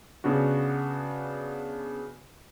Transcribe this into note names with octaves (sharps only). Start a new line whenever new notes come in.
C#3 B3 D4 F#4